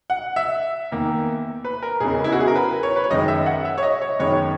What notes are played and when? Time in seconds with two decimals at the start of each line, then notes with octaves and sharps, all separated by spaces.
0.10 F#5
0.36 E5
0.92 E2 D#3 A#3
1.65 B4
1.83 A#4
2.00 E1 E2 C#3 G#4
2.24 E4
2.32 F#4
2.40 G#4
2.48 A#4
2.55 B4
2.83 C#5
2.96 B4
3.04 C#5
3.11 F#2 D#3 G#3 D#5
3.28 E5
3.46 F#5
3.65 E5
3.78 C#5
3.83 D#5
4.02 C#5
4.19 F#2 D#3 G#3 B3 C#5